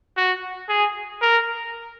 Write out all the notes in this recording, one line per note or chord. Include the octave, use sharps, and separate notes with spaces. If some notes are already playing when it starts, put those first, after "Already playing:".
F#4
G#4
A#4